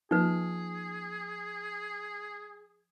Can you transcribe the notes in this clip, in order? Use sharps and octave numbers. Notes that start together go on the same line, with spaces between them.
F3 A#3 D#4 F4 G#4 B4